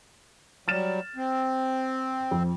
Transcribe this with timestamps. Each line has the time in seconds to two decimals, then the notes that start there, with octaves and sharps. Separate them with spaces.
0.68 F#3 G3 F6 A6 E7
1.16 C4
2.31 F2